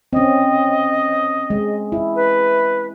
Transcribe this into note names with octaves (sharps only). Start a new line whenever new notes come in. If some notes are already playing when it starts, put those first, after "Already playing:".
C4 C#4 D#5
G#3
E4
B4